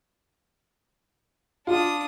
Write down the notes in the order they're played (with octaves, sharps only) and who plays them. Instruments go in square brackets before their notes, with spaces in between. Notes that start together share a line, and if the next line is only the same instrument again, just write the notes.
[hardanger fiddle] D4 D#6 [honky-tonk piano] F4